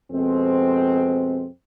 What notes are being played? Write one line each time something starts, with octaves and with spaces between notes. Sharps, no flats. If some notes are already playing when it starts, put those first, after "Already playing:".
F2 B2 G#3 C4